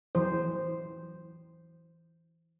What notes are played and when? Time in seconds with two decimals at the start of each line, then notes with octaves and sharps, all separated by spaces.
0.15 E3 F#3 C5